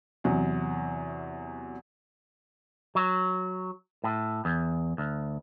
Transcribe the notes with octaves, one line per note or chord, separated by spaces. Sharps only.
E2 C3 F#3
F#3
A2
E2
D2